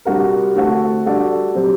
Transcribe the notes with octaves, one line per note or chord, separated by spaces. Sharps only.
C3 G3 D4 F#4 A#4
D3 A3 C4 F#4 A4
G3 D4 F#4 A4 D5
C3 F#3 C4 G4